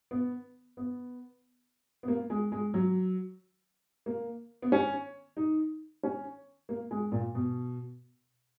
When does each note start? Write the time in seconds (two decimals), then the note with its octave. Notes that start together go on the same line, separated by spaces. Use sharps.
0.11 B3
0.77 B3
2.03 B3
2.08 A#3
2.30 G#3
2.52 G#3
2.74 F#3
4.06 A#3
4.62 B3
4.72 C#4
5.37 D#4
6.03 C#4
6.69 A#3
6.91 G#3
7.12 A#2
7.35 B2